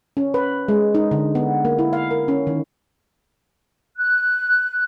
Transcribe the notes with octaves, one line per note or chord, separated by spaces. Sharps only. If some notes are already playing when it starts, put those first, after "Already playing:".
C#4
B4
G#3
D#4
D3
B3
A#3
E4
F5
A#4
C#4
D#3
F#6